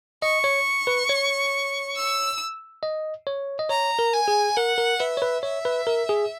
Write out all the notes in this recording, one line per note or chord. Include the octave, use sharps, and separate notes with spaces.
D#5 C#6
C#5
B4
C#5
E6
D#5
C#5
D#5
C#5 A#5
A#4
G#5
G#4
A#4 F#5
A#4
B4 E5
C#5
B4
C#5 E5
B4
A#4
G#4